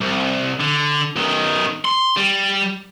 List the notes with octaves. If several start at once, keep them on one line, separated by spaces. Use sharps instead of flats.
C2
D3
B1 D#3
C6
G3